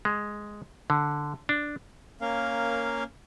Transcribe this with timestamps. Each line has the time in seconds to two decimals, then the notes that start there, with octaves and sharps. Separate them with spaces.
0.05 G#3
0.90 D3
1.49 D4
2.21 A#3 C#4 A#4 F5